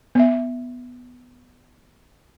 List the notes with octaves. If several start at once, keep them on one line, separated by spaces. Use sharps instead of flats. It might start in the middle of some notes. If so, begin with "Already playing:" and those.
B3 E5